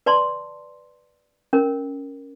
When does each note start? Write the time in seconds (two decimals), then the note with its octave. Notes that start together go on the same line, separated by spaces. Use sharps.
0.06 B4 D5 A5 C6
1.53 C#4 A#4